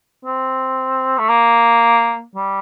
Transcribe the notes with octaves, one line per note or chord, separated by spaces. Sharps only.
C4
A3
A#3
G3